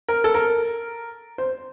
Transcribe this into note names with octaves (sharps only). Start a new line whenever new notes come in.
A#4
A4
A#4
C5